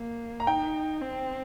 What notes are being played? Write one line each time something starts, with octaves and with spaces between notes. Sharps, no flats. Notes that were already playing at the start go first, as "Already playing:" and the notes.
Already playing: A#3
A#5
D#4 G5
C4